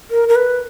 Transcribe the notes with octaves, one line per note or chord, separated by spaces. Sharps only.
A#4
A#4
B4